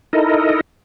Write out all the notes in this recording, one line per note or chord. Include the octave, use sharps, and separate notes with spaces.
D#4 E4 A4 A#4 D#5